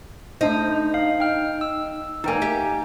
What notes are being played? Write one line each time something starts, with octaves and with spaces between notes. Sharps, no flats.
A3 D4 D#4 C5
F5
G5 F6
E6
E2 A#3 D#4 G5 G#5
G4 E5